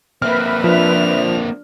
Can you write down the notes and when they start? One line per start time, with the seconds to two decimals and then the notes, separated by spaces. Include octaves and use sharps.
0.22 A#3 C4 B4 E5 F6
0.64 F3 D4 F7